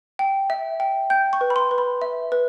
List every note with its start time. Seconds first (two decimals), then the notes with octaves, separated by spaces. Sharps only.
0.19 G5
0.50 E5
0.80 G5
1.10 G5 G6
1.33 C#6
1.41 B4
1.50 B5
1.56 C6
1.71 B4
1.78 B5
2.02 E5
2.32 B4